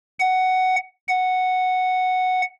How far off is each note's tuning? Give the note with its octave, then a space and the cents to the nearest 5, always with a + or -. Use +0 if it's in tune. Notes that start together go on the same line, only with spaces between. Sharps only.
F#5 +10
F#5 +0